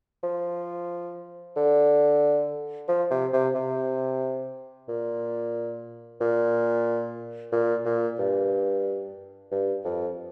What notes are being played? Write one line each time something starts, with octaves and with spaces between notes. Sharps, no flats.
F3
D3
F3
C3
C3
C3
A#2
A#2
A#2
A#2
G2
G2
F2